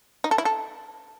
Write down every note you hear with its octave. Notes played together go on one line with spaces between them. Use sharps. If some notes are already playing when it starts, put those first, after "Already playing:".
D#4
A4
E4
A4